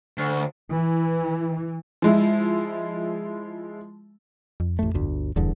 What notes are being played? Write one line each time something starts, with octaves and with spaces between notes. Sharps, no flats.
D2
E3
F3 G#3 E4
F2
A1 A3
G1 D2
D#1 E2 G2 D3